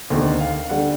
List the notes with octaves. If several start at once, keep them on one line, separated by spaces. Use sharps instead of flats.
D2 C3 D#3
F5
D3 G3 F#5